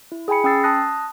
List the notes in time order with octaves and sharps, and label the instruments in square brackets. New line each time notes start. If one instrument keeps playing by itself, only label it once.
[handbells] E4
G#4 G5 G#5 B5 C#7
C#4 G5 D#6 E6 A6 C7
A5 D#6 F#6 A#6